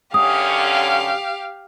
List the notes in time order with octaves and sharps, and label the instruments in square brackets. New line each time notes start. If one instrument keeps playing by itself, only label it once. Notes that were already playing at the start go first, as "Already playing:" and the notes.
[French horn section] F#2 D3 C#4 [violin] G4 F5 [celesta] D#6